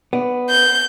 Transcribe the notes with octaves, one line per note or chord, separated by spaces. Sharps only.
B3 D5
G6